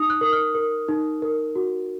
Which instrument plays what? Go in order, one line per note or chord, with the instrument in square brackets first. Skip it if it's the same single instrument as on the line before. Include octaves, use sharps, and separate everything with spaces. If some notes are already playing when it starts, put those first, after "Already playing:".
Already playing: [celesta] D#4 D#6
F#6
A#4 D#6
F6
A#4
D#4
A#4
F#4